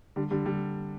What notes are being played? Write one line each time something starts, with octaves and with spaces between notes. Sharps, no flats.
D3 G3
D3 G3
D3 G3